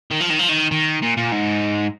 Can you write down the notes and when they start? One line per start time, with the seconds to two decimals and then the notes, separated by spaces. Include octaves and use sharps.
0.11 D#3
0.20 F3
0.30 D#3
0.39 F3
0.49 D#3
0.71 D#3
1.02 A#2
1.17 A#2
1.32 G#2